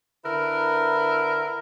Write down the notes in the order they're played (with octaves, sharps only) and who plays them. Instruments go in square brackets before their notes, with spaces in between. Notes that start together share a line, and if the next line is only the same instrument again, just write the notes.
[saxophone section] D3 E4 A#4 B4